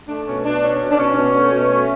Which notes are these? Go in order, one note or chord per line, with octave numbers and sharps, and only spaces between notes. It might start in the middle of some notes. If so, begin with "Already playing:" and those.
A3 D4
B2 C#4
B2 D4
C#4
B2
D4
B2 C#4
B2
A3
B2
A3